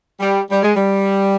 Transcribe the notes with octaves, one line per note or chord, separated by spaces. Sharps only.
G3
G3
G#3
G3